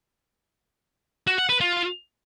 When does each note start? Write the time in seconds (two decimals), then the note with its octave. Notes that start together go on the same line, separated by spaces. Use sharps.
1.27 F#4
1.38 F#5
1.49 B4
1.60 F4